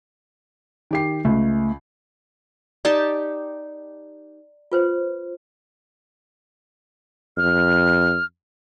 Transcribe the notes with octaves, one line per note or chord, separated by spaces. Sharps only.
D#3 G4 C7
C#2 A3
D#4 G4 D5 A5
F4 B4 C5
F2 F6